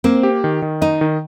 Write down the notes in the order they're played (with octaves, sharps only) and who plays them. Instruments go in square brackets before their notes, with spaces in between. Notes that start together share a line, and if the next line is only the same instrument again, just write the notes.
[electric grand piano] A#3 [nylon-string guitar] C4
[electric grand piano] G4
D#3
D#3
[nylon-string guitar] D#4 [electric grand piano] D#5
[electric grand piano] D#3